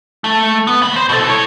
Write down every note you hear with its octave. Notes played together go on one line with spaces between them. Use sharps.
A3
B3
D#3 B5
C5
B2 A4
E4 C#5